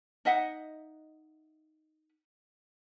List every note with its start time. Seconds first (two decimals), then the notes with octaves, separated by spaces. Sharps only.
0.25 D#4 D#5 E5 F#5